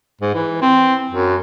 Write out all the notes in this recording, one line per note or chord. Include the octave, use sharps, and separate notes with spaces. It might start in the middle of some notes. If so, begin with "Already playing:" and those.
G#2
E3
C4
F#2